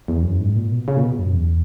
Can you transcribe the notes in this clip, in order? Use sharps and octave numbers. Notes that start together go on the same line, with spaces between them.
E2
F#2
G#2
A#2
B2
C#3
A#2
B2
F#2
E2